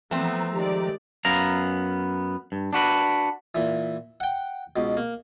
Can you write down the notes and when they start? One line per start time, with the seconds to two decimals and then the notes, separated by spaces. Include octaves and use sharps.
0.11 E3 F3 A3 B3 C4 A#5
0.53 D#3 G#3 G4 D5
1.25 F#2 B3 F5 A#5
2.52 G2
2.73 D4 F#4 B4
3.55 A#2 E3
4.20 F#5 G5
4.76 C#2 B2
4.97 A#3